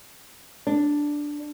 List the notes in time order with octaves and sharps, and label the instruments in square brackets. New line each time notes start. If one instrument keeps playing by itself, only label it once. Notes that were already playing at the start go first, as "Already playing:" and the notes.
[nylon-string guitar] D4